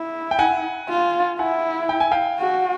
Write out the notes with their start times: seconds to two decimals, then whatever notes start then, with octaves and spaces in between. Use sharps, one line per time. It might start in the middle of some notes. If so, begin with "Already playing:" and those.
Already playing: E4
0.31 G5
0.39 F#5 G#5
0.89 F4
1.39 E4 F#5 G#5
1.89 G5
2.00 G#5
2.11 F5 G5
2.39 F#4